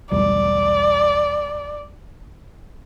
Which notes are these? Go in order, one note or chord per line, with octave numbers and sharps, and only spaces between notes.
B1 E2 G3 D5